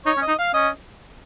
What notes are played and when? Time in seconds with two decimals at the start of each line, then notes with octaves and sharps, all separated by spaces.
0.06 D#4 C#5
0.17 C#4
0.22 D#5
0.28 D#4
0.39 F5
0.54 C#4 D#5